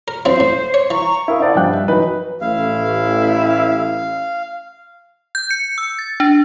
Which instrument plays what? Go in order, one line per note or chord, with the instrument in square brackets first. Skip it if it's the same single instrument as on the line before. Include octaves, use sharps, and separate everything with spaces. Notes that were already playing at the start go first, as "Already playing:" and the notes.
[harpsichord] A#4
[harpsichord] F#2 E3 C4 [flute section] C5
[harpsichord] A2
C#5
[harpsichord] E3 [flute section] A#5 C#6
[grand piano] E4 A#4 F5 D#6
E4 F4 C5 D5 F#5 A5
G2 F3 D#5 G5 F#6
E5
E3 F#3 D#4 E4 B4
[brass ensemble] A1 [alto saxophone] E4 [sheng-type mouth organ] F5
[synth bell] G6
C#7
E6
A6
D4